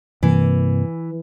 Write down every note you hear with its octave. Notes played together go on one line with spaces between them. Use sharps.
G2 C3 E3 A#3